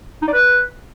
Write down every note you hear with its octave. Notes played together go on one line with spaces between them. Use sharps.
D#4
D5
B4